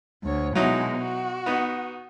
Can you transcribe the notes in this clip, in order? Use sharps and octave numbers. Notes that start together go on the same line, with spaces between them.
D2 C#5
B2 F#3 G#3 D#4 E4
F#4
B3 D#4